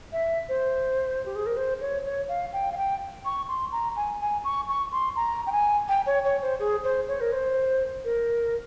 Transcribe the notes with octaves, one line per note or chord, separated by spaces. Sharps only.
E5
C5
G4
G#4
A#4
C5
C#5
C#5
F5
G5
F5
G5
C#6
C6
A#5
G#5
G#5
C#6
C#6
C6
A#5
G5
G#5
G5
C#5
C#5
C5
G#4
C5
C#5
A#4
C5
A#4